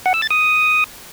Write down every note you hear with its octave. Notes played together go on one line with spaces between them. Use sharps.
F#5
E6
A6
D#6